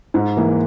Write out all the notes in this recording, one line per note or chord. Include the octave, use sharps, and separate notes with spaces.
G#2
E3 A#3